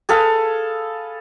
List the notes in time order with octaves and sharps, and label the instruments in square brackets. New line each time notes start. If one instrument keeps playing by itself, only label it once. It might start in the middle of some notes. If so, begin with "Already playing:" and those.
[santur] G#4 A4 B4 F5